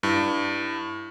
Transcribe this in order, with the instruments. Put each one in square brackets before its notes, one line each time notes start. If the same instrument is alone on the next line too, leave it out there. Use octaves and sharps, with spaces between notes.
[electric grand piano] G2 [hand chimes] E4